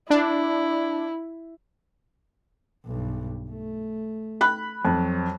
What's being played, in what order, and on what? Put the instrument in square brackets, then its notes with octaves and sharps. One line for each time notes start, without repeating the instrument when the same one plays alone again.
[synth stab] D4 [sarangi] E4
[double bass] B1 G2
A3
[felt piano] B5 F#6
[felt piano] F2 [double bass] F#3